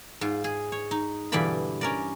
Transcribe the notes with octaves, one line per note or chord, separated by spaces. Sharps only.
G#2 F4
G#4
C#5
D#4
G2 B2 D3 E3 D5 B5
C#4 A#4 D5